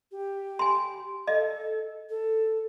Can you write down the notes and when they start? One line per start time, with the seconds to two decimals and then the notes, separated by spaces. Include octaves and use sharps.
0.11 G4
0.59 G#5 C6
1.27 A4 D#5
2.09 A4